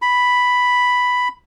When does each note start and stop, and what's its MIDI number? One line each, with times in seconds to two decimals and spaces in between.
0.02 1.28 83